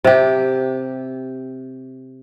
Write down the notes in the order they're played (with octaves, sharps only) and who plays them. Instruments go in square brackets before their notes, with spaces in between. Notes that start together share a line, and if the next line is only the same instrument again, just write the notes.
[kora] C3 G4